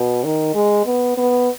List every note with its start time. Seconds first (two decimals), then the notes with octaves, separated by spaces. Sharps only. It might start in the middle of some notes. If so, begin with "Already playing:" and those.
Already playing: B2
0.24 D#3
0.54 G#3
0.85 B3
1.17 B3